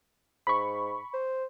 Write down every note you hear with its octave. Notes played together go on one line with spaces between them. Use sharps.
G#2 B5 C#6
C5